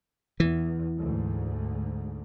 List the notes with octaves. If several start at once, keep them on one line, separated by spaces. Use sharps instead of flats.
E2 E3
D2 G#2